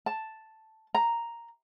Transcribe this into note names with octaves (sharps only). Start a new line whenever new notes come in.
A5
A#5